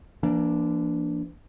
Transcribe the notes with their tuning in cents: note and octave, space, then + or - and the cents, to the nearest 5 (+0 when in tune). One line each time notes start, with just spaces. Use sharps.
E3 +45 A#3 +15 D4 +0